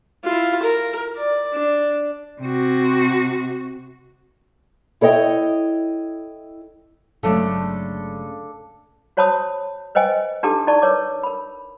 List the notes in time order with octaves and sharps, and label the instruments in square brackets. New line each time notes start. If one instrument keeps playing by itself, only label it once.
[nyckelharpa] E4 F4
A#4
D5
D4
[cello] C3 F#4
[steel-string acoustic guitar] E4 A4 C#5 D#5 G5
[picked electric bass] G1 F#3 [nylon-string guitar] C#3 G#3 A3 [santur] D4 A4
[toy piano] F#4 C5 C#5 A5 B5 D#6
B4 C5 D#5 G5 G#5
D4 D#4 G4 A4 A5 D6
D#4 E4 D5 A5 C#6
A#4 B4 C#5 D6
A#4 B5